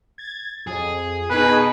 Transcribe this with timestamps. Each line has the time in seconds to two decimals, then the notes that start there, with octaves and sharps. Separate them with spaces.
0.18 G#6 A6
0.67 F2 G#4
1.30 B2 D#4 G#4 B4 G#5